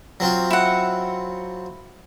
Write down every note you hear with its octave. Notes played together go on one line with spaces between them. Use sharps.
F#3 C4 F4
E4 F#5